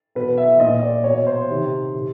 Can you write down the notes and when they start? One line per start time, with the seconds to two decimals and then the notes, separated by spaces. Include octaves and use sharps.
0.15 B2 B4
0.38 E5
0.60 A#2 D#5
0.83 D5
1.04 B2 C#5
1.27 C5
1.49 C3 D#3
1.94 C3